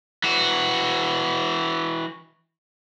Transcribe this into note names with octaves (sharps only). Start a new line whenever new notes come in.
E3 F#4